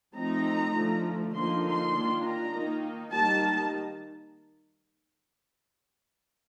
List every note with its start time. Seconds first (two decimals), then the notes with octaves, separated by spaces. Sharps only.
0.15 F3 A3 C4 D#4 A#5
0.75 D3 F3 A3
1.34 D3 F3 A#3 D#4 C6
1.64 C6
1.94 D#3 A#3 D4 F4
2.24 A#5
2.53 D#3 A#3 D#4
3.13 D#3 G3 A#3 D#4 A5